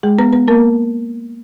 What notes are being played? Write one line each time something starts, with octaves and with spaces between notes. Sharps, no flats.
G#3 G#4
B3 B4
B3 B4
A#3 A#4